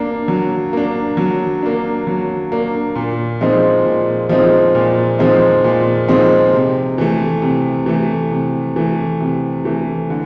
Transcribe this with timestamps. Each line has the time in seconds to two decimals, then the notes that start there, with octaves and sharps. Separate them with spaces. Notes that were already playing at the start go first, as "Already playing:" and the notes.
Already playing: A#3 D4
0.28 F#3
0.73 A#3 D4
1.17 F#3
1.63 A#3 D4
2.07 F#3
2.52 A#3 D4
2.95 A#2
3.41 F3 G#3 C4 D#4
3.85 A#2
4.29 F3 G#3 C4 D#4
4.75 A#2
5.19 F3 G#3 C4 D#4
5.64 A#2
6.09 F3 G#3 C4 D#4
6.54 C3
6.98 E3 A3
7.42 C3
7.86 E3 A3
8.31 C3
8.76 E3 A3
9.20 C3
9.65 E3 A3
10.10 D3